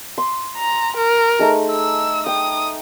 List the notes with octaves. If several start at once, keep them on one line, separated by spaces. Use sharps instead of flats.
C6
A#5
A#4
A3 D#4 G#4
E6
G5 D#6